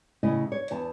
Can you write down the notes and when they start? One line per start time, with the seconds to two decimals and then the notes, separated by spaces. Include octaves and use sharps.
0.23 A2 C#3 E4 D#5
0.52 C#5
0.71 E2 A5